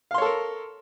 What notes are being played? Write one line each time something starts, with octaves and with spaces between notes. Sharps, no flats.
A4 A#4 C#5 F5 C6